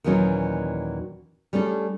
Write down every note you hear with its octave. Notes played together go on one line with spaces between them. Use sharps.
D#2 A#2 E3 F#3 C#4 D#4
G3 A3 C#4 D4 A4